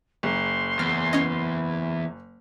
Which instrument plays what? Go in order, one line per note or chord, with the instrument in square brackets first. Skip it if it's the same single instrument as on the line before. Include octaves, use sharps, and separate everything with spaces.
[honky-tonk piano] F#1 [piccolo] C6
[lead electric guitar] E2 [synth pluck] F6
[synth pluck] C#4 D#5